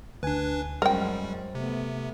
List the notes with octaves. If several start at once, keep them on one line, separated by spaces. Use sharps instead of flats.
D2 D4 B4 G#5
F#2 G3 G#3 C#4 A#4 C5 G5
C3 A3 B3